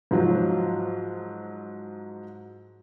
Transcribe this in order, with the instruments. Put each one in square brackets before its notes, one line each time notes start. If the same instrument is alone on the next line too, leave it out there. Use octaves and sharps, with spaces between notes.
[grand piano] G#2 F3 F#3